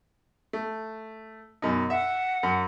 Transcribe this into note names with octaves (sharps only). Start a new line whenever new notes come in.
A3
F#2 B2 D#4
E5 F#5
F#2